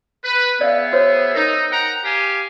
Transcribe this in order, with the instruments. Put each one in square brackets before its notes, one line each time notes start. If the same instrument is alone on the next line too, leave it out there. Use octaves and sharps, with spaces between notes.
[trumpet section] B4
[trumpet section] B3 G#4 E5 [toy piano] D5 F5
[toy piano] F#4 C5 C#5
[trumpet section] D#4 [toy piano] A#4 D#6
[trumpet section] F#5 G5 A#5
G4 F5 G#5